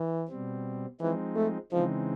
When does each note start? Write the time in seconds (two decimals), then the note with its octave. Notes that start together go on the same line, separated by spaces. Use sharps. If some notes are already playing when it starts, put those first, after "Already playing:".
Already playing: E3
0.28 B2 G3 C4
1.00 E3 F3 G#3 C4 D#4
1.36 A3
1.72 C#3 E3 F3 G#3 C4 D#4